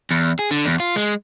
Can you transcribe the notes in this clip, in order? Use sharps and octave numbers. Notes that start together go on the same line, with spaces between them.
E2
G#4
D3
E2
F4
G#3